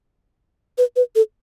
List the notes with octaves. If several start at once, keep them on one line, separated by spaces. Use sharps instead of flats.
B4
B4
A4